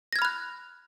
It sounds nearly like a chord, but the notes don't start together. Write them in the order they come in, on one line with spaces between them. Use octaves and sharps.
A#6 G#6 F6 B5 F#6